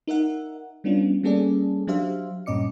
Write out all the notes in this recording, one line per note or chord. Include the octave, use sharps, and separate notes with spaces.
D#4 A#4 E5 F#5
G3 B3 C#4 D4 F4
G3 A#3 C#4 G#4 A4 D5
F#3 D4 G4 C5 E5 F5
G2 A#2 C#4 D#5 D6 C#7